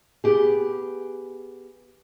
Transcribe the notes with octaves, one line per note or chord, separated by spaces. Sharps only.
B3 G4 G#4